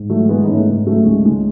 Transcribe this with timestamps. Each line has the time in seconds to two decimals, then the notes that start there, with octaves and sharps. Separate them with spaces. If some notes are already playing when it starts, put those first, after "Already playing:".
Already playing: G#2
0.09 E3 F#3 A3
0.29 E3 G#3 B3
0.44 D#4
0.48 G#2 A3 C#4
0.67 C#3
0.87 C#3 F#3 A3
1.06 C#2 G#3
1.25 C#3 G#3